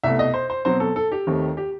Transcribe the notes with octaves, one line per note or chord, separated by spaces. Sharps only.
C2 B2 A3 E5
D#5
C5
C5
B2 F#3 C4 C5
A4
A4
G4
D#2 D#3 A3 C4
G4